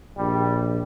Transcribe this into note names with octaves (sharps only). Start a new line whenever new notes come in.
A#1 G3